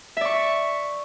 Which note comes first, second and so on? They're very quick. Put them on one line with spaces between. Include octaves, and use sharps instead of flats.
E5 D5 C#6